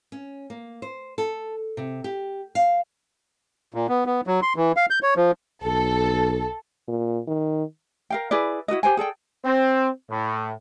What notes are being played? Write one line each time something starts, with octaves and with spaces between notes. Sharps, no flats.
C#4
A#3
C5
A4
C3
G4
F5
A#2
B3
B3
F#3
C6
E3
F5
G6
C#5
F3
B1 A4
A#2
D#3
A#4 F5 G5
E4 G#4 B4 D5
E4 F#4 A#4 D#5
G4 C5 G5 G#5
G#4 A4 D5 G5
C4
A2